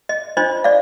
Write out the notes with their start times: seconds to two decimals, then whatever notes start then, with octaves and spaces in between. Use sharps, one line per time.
0.09 D#5
0.37 D4 F4 C5 D#5
0.64 D5 F5